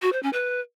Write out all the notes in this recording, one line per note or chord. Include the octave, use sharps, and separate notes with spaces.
F#4
C5
C#4
B4